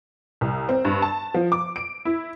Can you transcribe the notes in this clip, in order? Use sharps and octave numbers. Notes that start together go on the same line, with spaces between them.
C2
C4
G2
A5
F3
D6
D7
E4